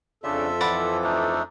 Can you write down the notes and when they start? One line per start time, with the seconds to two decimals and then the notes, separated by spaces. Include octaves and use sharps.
0.24 F2 C#3 D4 F4 A4 E5
0.61 E3 F3 D5 F#5 B5
1.04 A3 D4 D#4